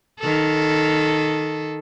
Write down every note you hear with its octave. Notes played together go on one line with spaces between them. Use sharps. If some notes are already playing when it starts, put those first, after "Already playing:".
D#3 A4